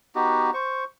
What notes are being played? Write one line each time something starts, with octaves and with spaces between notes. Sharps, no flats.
B3 D#4 F#4 G4
C5 C#6